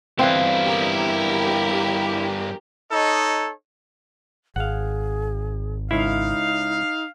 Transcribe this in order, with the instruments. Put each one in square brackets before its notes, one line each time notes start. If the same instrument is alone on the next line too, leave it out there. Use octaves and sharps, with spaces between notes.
[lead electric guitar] G2 B3 [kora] E3 C4 [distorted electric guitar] E4 F5
[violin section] G4 A#4
[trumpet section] D#4 A4 C#5 D#5
[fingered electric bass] G#1 [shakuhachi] G#4 [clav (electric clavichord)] F5 F#5
[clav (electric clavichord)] C#2 E4 [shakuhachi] D#4 [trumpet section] F5